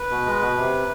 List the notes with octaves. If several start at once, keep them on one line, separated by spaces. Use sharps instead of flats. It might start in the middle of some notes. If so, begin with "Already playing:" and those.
Already playing: B4
B2
G#3
B2
C3